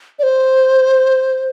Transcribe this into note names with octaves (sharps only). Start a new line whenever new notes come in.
D5
C5